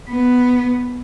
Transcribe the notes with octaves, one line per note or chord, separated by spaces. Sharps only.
B3